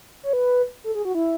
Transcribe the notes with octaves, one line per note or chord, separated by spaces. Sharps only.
C#5
B4
A4
G#4
F#4
E4